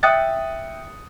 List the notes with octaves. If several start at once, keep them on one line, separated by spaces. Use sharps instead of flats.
E5 G5 D#6 F#6 A6 C#7